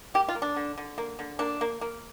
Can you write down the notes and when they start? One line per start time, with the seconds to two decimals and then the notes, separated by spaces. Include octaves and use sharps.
0.14 A#3 G4
0.29 F4
0.35 A#3
0.42 D4
0.56 D3
0.78 D3
0.98 A#3
1.19 D3
1.39 A#3 D4
1.61 A#3
1.81 A#3